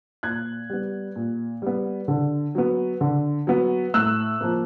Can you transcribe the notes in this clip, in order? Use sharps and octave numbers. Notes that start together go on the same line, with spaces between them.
A#2 F#6 G#6
G3 B3
A#2
G3 B3
D3
F#3 B3
D3
F#3 B3
A2 E6 F#6
F3 A#3